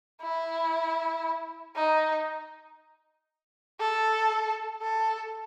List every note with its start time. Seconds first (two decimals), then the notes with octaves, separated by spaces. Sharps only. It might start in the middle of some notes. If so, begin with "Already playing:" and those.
0.22 E4
1.76 D#4
3.80 A4
4.82 A4